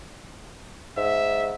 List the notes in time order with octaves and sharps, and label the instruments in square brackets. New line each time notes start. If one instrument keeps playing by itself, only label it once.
[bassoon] G#2 [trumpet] E5